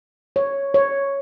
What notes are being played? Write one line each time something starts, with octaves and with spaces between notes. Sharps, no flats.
C#5
C#5